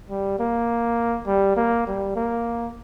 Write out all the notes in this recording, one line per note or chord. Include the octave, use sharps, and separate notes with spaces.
G3
A#3
G3
A#3
G3
A#3